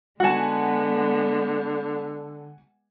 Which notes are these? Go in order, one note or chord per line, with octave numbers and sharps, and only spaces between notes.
D3 G#3 B3 F#4 F#5 G#5 A5